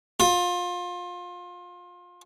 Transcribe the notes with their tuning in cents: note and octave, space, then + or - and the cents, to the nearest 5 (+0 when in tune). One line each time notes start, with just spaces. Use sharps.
F4 +25